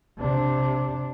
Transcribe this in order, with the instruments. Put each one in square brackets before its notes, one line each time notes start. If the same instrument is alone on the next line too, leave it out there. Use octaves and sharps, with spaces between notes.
[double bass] C3 D4